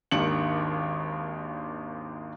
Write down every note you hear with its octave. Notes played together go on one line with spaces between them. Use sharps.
G#1 D#2 D#3 D4 C#7 F#7